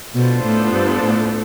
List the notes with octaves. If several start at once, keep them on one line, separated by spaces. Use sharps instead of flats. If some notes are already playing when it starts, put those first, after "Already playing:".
B2 B3 D4 F4 A4 C5
A2
G2
A2